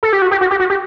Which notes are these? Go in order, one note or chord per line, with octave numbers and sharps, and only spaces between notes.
A4
G4
F#4
G4
F#4
G4
F#4
G4